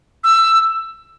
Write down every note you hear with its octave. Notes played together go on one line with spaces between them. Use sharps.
E6